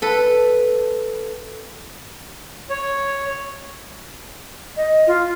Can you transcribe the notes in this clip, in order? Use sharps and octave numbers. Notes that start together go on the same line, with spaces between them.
A4 B4
C#5
D#5
F4